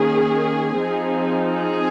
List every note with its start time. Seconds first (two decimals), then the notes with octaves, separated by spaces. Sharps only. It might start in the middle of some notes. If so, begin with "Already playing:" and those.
Already playing: D#3 A#3 C#4 G#4
0.79 F3 C4 D#4
1.54 G#4